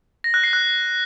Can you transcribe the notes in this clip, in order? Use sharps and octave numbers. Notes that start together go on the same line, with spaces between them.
A#6
F#6
C7
F#6